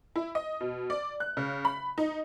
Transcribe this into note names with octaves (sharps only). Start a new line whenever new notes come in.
E4
D#5
B2
D5
F#6
C#3
B5
D#4